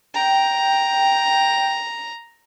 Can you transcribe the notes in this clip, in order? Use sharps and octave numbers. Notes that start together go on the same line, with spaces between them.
G5 A#5